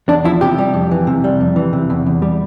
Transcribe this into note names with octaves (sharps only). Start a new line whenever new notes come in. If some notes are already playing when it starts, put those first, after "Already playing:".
E2 D4
F3 E4
C3 G4
G3
F2
E3
C3
G3
F2
E3
C3
E2
E2
G3